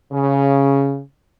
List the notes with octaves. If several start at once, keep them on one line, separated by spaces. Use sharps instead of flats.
C#3